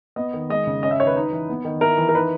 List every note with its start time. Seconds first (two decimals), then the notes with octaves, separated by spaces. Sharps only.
0.16 B3 D#5
0.34 D#3
0.49 G#3 D#5
0.67 C#3
0.83 C#4 D#5
0.91 E5
1.00 D#3 C#5
1.07 B4
1.16 D#4
1.32 E3
1.49 B3
1.65 D#3
1.81 E4 A#4
1.98 E3
2.09 A#4
2.15 D#4 B4